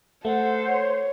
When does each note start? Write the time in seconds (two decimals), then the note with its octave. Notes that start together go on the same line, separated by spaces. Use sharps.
0.25 A3 A4 C5 F#5
0.70 C#5